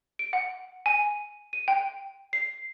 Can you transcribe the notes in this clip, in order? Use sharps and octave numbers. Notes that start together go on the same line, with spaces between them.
D7
F#5
G#5
D#7
G5
C7